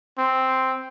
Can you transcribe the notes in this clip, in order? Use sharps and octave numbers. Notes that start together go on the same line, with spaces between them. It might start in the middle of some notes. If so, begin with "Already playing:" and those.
C4